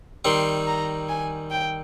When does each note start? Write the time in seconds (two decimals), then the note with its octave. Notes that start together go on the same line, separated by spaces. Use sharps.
0.25 D#3 G3 C4 C6
0.67 A#5
1.09 G#5
1.51 G5